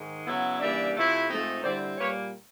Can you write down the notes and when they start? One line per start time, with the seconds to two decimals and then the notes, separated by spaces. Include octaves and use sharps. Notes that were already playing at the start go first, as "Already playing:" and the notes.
Already playing: G#2 D#3 G#3
0.25 C#3 F#3 B3 E4
0.60 C#3 E3 G3 A#3 D4 D5 E5
0.95 C3 F3 A3 C4 E4
1.28 G#2 F3 A3 C4 D#4
1.63 D3 G3 C4 E4 C5 D5
1.97 A#2 G3 A#3 B4 C#5